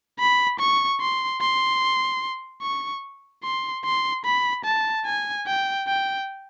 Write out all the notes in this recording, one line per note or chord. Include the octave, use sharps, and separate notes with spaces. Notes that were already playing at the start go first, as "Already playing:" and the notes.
B5
C#6
C6
C6
C#6
C6
C6
B5
A5
G#5
G5
G5